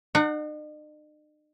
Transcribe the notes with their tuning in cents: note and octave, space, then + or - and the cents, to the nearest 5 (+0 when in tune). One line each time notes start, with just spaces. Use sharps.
D#4 -45 F#5 +0